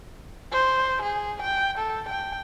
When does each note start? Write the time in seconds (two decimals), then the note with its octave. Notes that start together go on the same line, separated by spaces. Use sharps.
0.52 C5
1.02 G#4
1.42 G5
1.78 A4
2.08 G5